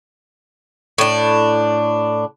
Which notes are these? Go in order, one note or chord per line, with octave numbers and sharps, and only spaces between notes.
A2 D4